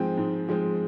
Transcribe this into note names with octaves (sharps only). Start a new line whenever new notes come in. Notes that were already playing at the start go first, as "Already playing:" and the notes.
Already playing: G#2 F3 G#3 C4 G5
G#2
F3 G#3 C4